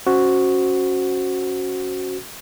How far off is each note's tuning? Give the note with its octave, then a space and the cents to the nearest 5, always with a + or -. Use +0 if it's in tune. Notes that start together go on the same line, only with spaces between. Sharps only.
C#4 -10 F#4 +0 C5 +0